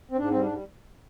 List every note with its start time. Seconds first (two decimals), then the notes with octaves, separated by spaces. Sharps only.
0.11 C4
0.17 G#2 D4
0.30 G3 C4
0.43 D4
0.51 G3